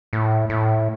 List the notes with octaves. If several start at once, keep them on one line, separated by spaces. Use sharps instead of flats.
A2
A2